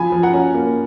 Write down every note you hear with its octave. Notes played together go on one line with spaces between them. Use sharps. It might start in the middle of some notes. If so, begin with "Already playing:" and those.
Already playing: F3 G#5 B5
F3
F#5 A#5
C#4
A#3